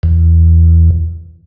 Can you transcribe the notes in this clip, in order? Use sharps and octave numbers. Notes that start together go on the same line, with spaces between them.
E2